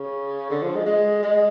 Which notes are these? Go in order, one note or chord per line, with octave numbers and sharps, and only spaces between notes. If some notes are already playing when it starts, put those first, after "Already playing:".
Already playing: C#3
D3
F3
G#3
G#3
G#3